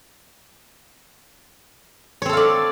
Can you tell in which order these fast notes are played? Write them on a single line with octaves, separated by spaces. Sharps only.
C#5 C4 A4 F5 D5